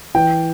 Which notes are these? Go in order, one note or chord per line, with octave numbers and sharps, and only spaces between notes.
E3 G5